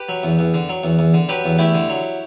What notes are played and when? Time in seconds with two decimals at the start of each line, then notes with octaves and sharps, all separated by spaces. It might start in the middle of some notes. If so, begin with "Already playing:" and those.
Already playing: G4 B4
0.09 F#3
0.23 E2
0.39 E2
0.54 D3
0.69 F#3
0.84 E2
0.99 E2
1.14 D3
1.29 F#3 G4 B4
1.44 E2
1.59 A3 E4 G4
1.74 D3
1.89 F#3